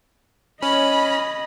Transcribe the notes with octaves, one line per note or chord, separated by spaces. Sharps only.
C#4 D#5 B5